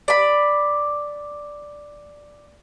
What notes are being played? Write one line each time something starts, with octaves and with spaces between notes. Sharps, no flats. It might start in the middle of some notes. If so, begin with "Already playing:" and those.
D5 B5